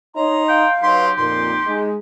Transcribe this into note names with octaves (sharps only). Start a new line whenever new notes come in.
D#4 C#5 D#5 A#5 C6
F5 G5
F#3 D#4 G4 B4 C6
F2 A#2 D#4 C6
G#3 D#4